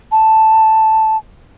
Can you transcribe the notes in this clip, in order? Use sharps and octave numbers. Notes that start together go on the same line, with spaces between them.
A5